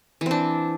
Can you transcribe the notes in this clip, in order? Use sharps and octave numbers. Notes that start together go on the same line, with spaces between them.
E3 C4 D4